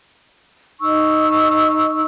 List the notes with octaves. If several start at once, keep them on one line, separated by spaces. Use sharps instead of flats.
D#4 C#6 E6